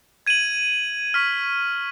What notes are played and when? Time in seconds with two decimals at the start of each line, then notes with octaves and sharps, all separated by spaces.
0.27 G#6 D#7 F#7
1.14 C#6 F6 B6